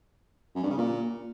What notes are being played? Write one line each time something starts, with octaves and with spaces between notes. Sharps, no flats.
F#2
G2
C#3
A#2